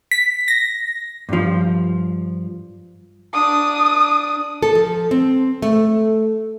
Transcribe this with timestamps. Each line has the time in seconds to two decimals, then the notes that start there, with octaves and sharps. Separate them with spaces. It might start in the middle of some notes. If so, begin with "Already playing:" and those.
0.11 B6
0.48 A#6
1.29 G2 F3
3.34 D4 D#6
4.63 A4
4.75 F3
5.11 C4
5.62 A3